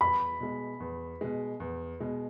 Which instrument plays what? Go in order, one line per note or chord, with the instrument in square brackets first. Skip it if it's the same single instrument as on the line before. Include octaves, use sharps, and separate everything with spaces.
[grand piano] E2 [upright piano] B5
[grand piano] B2 G#3
E2
B2 G#3
E2
B2 G#3